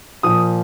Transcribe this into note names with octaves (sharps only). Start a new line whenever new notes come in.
A#2 F3 D#6